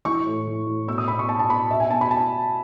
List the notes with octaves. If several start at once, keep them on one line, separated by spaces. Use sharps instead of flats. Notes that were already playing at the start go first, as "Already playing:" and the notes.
E3 C#6
A2
E3
A2
B2 E6
D#6
B2 B5
C#6
B2 A5
A5
B2 B5
B2 E5
G#5
B2 A5
B5
A5